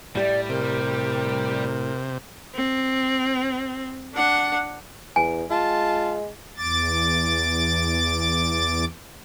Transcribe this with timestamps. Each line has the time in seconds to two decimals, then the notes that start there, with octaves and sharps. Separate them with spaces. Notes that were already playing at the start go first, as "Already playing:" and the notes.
0.15 A2 G3 G4 D5 E5
0.49 C3 A#4
2.55 C4
4.14 D4 F#5
5.16 E2 G#5
5.50 G#3 F4 A5
6.57 E2 D6 A6